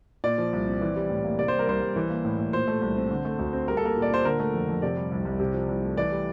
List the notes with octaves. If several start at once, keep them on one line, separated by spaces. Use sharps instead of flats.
A#2 D5
F3
C2
C4
E3
G3
A2
A#3
C3 D5
G3 C5
A#4
C2 C5
C2
E3
A#3
A2
A2
A#2 C5
A3
C2
C4
D3
A3
D2
C4
G3 A#4
A4
A#3 A#4
A#2
D5
A#2 C5
D3 A#4
A3
F2
F2
C3 D5
G3
C2
C2
C3
F3
C2
A3
E3 D5
G3